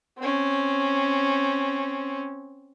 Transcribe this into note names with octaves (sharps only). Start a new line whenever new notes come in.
C4 C#4